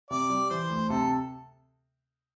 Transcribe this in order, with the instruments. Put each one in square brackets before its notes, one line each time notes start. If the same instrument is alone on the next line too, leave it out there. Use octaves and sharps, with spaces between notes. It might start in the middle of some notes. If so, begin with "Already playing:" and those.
[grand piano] C3 [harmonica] D5
[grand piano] G3
[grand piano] E3 [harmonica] C5
[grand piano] D2
[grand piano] C3 [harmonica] A4